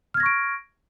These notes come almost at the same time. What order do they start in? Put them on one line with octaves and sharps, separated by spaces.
F6 G#6 A#6 C#6 D7